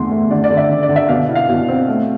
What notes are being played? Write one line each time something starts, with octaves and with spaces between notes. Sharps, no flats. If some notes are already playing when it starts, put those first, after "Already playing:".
Already playing: E2 D3 A3 C6
A3
D3 D5
D5
D3
E5
D3
D5
D3
E5
B2 F5
E4
F5
B2
C4
A3